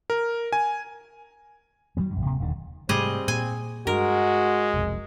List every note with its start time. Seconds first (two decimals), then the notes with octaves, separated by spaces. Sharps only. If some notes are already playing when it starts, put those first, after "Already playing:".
0.10 A#4
0.53 G#5
1.97 D#3 F#3 G3 A#3
2.14 A#1 F#2
2.25 D1 C3 A#3
2.40 D#1 D#2 D3 D#3
2.89 G#2 C3 G3 A3 C4 G#4 D#5
3.28 A#2 G#5
3.87 G2 G#3 F#4 A#4
4.74 F1 B1 F2